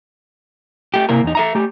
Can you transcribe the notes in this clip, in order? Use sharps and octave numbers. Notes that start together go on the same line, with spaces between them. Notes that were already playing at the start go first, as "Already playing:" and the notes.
A3 G4
C3 A#3 E4 A#4
E2 D#4
A4 E5 A#5
A3 G4